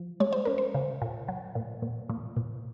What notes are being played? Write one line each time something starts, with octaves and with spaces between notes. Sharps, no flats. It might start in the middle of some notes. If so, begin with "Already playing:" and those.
Already playing: F3
G#3 C#5
C5
C#4 A#4
C5
C#3
A#2
F#3
A#2
A#2
A#2
A#2